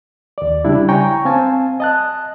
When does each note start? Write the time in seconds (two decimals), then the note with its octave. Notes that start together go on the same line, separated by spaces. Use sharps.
0.38 D#2 D5
0.65 C#3 G3 D4 E4
0.89 C#5 G5 G#5 A#5 C#6
1.25 C4 F5 G#5 A5
1.80 D#5 A5 F#6